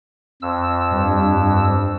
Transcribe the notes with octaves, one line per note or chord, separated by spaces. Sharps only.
F2 E6
G2